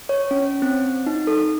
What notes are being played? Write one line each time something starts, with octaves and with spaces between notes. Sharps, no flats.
C#5
C#4
C4
D#4
A4